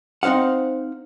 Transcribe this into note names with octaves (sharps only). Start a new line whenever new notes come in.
C4 D#4 C5 F5 F#5